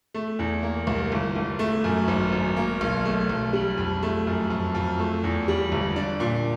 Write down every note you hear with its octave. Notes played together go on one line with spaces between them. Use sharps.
A3
E2
A#3
C2
G1
G1
A3
F#2
G#1
G#1
A#3
B1
A3
B1
G3
F2
A3
F#2
F2
F2
A3
E2
G3
G1
D4
A#2